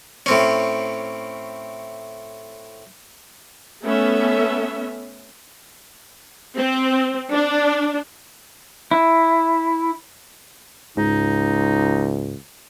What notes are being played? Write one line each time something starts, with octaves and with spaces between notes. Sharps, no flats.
A2 C4 C#4
A3 B3 C#4 A4 E5
C4
D4
E4
C#2 G#2 D#4